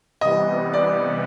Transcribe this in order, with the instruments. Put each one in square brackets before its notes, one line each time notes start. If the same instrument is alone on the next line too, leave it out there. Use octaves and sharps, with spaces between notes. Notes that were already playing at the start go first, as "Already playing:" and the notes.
[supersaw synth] C3 E3 G3 B3 [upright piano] D#5
[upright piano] D5